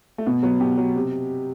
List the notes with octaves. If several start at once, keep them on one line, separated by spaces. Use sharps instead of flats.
A3
B2 B3
F#3 B3
B2 G4
F#3
C3